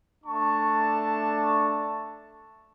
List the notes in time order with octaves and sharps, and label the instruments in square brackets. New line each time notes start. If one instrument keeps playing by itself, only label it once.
[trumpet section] A3 D4 A5 C#6